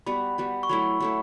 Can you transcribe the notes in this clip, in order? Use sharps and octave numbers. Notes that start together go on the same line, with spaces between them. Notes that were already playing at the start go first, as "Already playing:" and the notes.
G3 B3 F#4 B5
G3 B3 F#4
C#6
F#3 A3 E4 B5
F#3 A3 E4